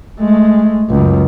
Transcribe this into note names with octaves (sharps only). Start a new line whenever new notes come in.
G#3 A3
C#2 F#2